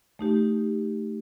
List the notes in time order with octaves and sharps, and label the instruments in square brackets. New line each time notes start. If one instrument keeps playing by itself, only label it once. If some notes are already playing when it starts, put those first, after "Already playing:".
[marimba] A3 D#4 G4